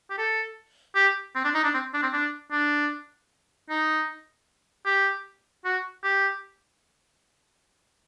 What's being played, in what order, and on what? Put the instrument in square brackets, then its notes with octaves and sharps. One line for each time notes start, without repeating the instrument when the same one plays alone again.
[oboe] G4
A4
G4
C4
D4
D#4
D4
C4
D4
C4
D4
D4
D#4
G4
F#4
G4